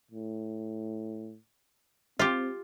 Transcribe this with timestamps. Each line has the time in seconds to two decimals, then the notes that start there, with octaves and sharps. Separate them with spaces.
0.11 A2
2.19 C4 F4 G4